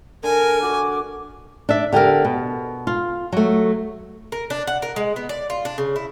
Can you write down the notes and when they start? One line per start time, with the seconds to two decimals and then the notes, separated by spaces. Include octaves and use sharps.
0.24 D3 A#4 G#5
0.62 F#4 D6
1.69 D4 E5
1.93 D3 G4 A4 A#4
2.25 B2
2.87 F4
3.32 F#3 A3
4.32 A#4
4.50 D4
4.67 F#5
4.82 A#4
4.96 G#3
5.16 B3
5.29 D5
5.50 F4
5.65 D4
5.78 C#3
5.96 E4